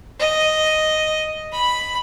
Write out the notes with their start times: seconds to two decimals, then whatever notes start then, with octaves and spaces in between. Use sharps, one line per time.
0.19 D#5
1.52 B5